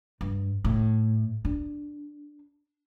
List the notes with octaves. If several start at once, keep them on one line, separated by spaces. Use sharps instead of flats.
G2
A2
D4